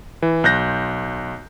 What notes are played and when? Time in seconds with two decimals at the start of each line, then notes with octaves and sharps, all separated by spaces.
0.22 E3
0.44 B1 F#6 G6 A#6